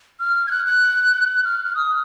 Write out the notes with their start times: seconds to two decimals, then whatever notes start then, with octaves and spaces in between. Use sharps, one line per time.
0.20 F6
0.47 G#6
0.51 F#6
0.66 F#6
1.44 F6
1.65 F6
1.75 D#6